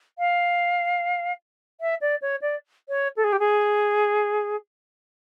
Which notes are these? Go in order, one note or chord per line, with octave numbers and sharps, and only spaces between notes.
F5
E5
D5
C#5
D5
C#5
A4
G#4
G4
G#4